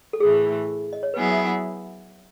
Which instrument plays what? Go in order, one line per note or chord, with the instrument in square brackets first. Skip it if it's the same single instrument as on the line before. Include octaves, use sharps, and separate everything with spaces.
[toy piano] A4
[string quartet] A2 E3 A3 [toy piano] G#4
[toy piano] D#5
C#5
[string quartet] F#3 B3 E4 G#4 [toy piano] B4
[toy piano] E5
F#5